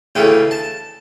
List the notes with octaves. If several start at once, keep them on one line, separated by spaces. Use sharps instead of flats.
D2 C#3 E3 A3 G5
A5